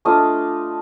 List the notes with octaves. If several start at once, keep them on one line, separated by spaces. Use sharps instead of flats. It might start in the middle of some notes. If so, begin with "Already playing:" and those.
A3 D4 F4 D#5 F5